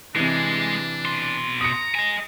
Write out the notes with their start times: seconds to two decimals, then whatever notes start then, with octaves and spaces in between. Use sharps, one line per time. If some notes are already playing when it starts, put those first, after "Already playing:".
0.16 C3 E3 G#3 D4
1.06 B2 C6
1.61 A#5 D#6 C#7
1.95 D#5 G#5